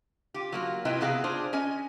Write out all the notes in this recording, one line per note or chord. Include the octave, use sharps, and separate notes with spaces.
F4 G4
F#3 A#3 F4
C3 E4 F4 B4 D#5 G5
C3 B3 G#4 F5 G5
D4 F4 G#4 C5
C#4 D#5 G#5